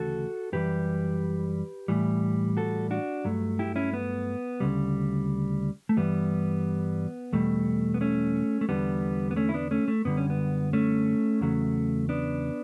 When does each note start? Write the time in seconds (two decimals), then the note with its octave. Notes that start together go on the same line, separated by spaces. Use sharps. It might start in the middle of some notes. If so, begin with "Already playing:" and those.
Already playing: D2 C#3 E3 A3 F#4 A4
0.52 F#2 E3 G3 G4 B4
1.88 A2 E3 G3
2.57 F#4 A4
2.91 D4 F#4
3.25 G2 F#3 A3
3.59 E4 G4
3.76 C#4 E4
3.93 B3
4.60 D2 C#3 G3
5.89 A3
5.97 G2 E3 G3 B3
7.33 E2 B2 G3 A3
7.94 B3
8.01 A3 C#4
8.61 A3
8.69 E2 D3 G3 B3
9.31 B3
9.36 A3 C#4
9.49 E4
9.54 B3 D4
9.71 A3 C#4
9.88 A3
10.05 F#2 D3 G3 B3
10.17 C#4
10.30 B3
10.73 A3 C#4
11.41 E2 C#3 F#3 A3
12.09 B3 D4